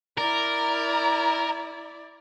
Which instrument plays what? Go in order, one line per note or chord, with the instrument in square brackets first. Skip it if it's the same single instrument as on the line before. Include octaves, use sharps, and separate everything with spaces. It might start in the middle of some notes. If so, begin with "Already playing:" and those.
[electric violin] E4 D5 [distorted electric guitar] A#4